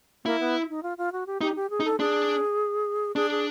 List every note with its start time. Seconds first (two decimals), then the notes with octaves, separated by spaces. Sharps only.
0.25 A#3 E4
0.40 B3
0.69 D#4
0.83 F4
0.98 F4
1.12 F#4
1.27 G4
1.41 D#4 G4
1.56 G4
1.70 G#4
1.80 D#4
1.85 A4
1.99 D4 G#4
3.16 D4 G#4
3.31 G#4